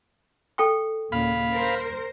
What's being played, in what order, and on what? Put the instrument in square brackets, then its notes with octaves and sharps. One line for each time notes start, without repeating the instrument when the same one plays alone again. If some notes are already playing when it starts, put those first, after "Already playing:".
[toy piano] A4 G5 C#6
[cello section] D#2 A#2 C#3 [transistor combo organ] F5 B5
[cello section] A#4 C5